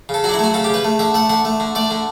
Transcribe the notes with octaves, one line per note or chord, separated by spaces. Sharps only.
C#3 A4
F#3 D4 F#4
E4
A3 F#4
C#3 A4
G4
C#3 B4
A3
D3 E5
A3 F#5
D3 F#5
A3
D3
A3 D5
D3